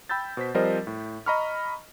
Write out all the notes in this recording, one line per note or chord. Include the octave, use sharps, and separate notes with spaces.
G5 B5 E6 G6 A6
B2 C5 B6
F3 G3 C4 A#4 C5 D#5
A2
D#5 A#5 B5 C#6 F6